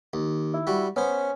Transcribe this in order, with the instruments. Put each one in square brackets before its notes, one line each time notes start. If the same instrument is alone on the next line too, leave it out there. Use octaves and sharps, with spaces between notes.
[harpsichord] D#2
[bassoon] E4
[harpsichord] G3 F#4
[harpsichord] B3 C5 [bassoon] C#4